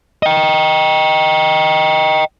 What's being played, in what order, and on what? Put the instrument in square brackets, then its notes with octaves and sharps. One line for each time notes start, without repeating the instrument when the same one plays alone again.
[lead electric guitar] D#5 G5